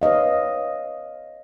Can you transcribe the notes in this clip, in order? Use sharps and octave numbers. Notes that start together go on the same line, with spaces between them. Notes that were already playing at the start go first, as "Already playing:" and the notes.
B4 C#5 D#5 F5